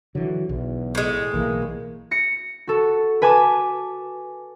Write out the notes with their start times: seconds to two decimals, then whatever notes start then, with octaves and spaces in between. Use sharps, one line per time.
0.15 D3 E3 F#3
0.49 B1 E2
0.95 A2 G#3
1.34 B1 E3 A#3
2.11 A#6 C#7
2.67 F#4 A4
3.22 B4 G#5 A5 D6